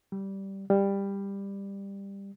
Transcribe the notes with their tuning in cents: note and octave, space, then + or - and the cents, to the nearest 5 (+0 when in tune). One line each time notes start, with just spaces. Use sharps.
G3 -10
G3 +15